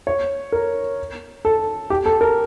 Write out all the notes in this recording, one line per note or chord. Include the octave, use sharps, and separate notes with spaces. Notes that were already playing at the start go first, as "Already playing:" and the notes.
C#5
A#4
A4
G4
A4
A#4